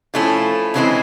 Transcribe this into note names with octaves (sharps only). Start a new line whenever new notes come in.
F3 A3 C#4 E4
C#3 E3 G#3 C4 E4